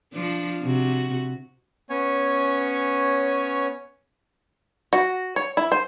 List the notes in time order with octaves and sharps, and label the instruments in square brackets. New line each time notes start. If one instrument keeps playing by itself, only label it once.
[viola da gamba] F3 D4
C3 F#4
[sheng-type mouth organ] B3 C#4 C#5 G#5
[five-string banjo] F#4
C#5
E4
C5